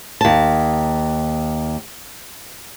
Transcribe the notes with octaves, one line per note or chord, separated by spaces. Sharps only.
D#2 A5